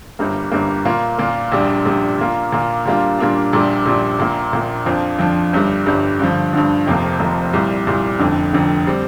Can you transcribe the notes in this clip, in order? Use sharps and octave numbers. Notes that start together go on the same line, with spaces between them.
G1 G2 G3 A#3
G1 G2 G3 A#3
A#2 A#3 F4
A#2 A#3 F4
A#1 A#2 G3 D4
A#1 A#2 G3 D4
A#2 A#3 F4
A#2 A#3 F4
A#2 G3 A#3 D4 F4
A#2 G3 A#3 D4 F4
A#1 A#2 G3 D4
A#1 A#2 G3 D4
A#1 A#2 A#3
A#1 A#2 A#3
F2 F3 D4 F4
F2 F3 D4 F4
G1 G2 G3
G1 G2 G3
G2 D3 F3
G2 D3 F3
F1 F2 C3 F3 A#3
F1 F2 C3 F3 A#3
C2 A#2 G3
C2 A#2 G3
F1 F2 D3
F1 F2 D3
G3 C4